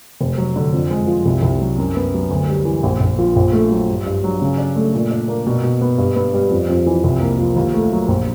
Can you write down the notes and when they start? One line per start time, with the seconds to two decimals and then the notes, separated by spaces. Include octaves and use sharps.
0.21 F1
0.37 F#3
0.56 D3
0.73 F2
0.90 G#3
1.07 F3
1.25 C2
1.43 C2
1.61 F#3
1.78 F#2
1.96 B3
2.14 F#3
2.31 D2
2.49 G3
2.65 E3
2.83 A#1
3.00 A#1
3.19 F3
3.36 A#1
3.53 A3
3.71 F#3
3.89 G2
4.06 G2
4.24 F#3
4.42 C#3
4.58 D4
4.76 A3
4.94 A#2
5.11 D4
5.28 A#3
5.47 B2
5.64 B2
5.81 B3
5.98 G2
6.16 B3
6.34 G3
6.51 F2
6.69 F2
6.86 E3
7.04 C2
7.21 A#3
7.39 F3
7.56 D#2
7.74 A3
7.92 F#3
8.08 A#1